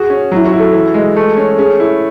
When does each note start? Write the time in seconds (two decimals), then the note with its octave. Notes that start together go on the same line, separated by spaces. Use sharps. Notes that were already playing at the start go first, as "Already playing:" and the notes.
Already playing: F#4 G#4
0.10 C#4
0.32 F#3 E4
0.45 F#4
0.53 E4
0.59 A4
0.73 E3
0.94 G#3
1.16 A3
1.37 C#4
1.58 C#4 G#4
1.80 E4